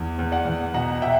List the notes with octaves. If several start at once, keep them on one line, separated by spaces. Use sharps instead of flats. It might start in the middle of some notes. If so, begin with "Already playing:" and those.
Already playing: E2
E2
D5 F#5
E2
B2 F#5 A#5
B2 E5 G5